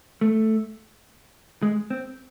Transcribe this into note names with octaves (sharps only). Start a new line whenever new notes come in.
A3
G#3
C4